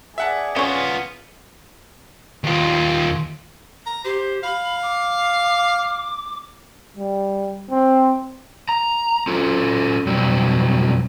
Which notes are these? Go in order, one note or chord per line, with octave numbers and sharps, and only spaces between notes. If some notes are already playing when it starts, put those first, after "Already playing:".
G#4 D5 E5 F#5 A5
B3 C#4 F4 C#5
D#2 F4
A#5
G4 C5
F5 B5
D6
G3
C4
A#5
C#4 F4 A4
F2 B2 F#3 G3